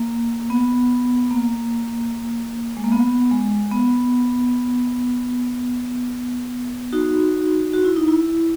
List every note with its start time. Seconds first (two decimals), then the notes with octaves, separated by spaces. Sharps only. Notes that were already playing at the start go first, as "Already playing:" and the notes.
Already playing: A#3
0.50 B3
1.31 A#3
2.77 G#3
2.84 A#3
2.92 B3
3.31 G#3
3.71 B3
6.93 D#4 F#4
7.73 F#4
7.85 E4
7.96 D#4
8.08 E4